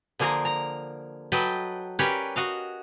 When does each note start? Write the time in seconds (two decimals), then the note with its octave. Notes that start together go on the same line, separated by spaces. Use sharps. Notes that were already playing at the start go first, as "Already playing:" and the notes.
0.19 D3 F3 A#3 G#4 A#4
0.45 A#5
1.32 F#3 A4 B4 D#5 G5
1.99 C#4 G4 A#4 B4 C#5 D5
2.36 F#4 D#5 F5